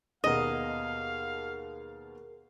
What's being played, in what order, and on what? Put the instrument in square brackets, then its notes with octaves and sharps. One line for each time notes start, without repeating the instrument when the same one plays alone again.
[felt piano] D#2 B2 B3 [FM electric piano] G#4 A#4 [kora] D#5 [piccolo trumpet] F5